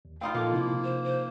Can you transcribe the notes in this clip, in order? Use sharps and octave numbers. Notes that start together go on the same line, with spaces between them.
D#2
C4 D#4 F4 F5 G5
A#2 F3 A#3 A4 D6
C3 E4
C5
C5